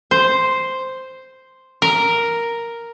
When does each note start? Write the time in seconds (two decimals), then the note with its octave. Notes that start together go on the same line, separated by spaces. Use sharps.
0.11 C5
1.82 A#4